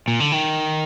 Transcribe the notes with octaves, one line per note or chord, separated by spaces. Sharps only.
A#2
D3
D#3